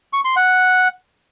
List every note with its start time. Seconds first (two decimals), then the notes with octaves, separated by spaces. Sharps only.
0.13 C#6
0.25 C6
0.36 F#5